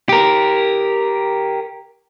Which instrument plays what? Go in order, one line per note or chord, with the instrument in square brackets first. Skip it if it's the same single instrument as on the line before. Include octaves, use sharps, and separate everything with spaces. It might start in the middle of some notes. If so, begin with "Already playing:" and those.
[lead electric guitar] G4 A#4